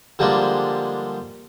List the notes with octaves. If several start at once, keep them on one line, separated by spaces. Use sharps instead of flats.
D3 F3 G3 G#3 A#3 D4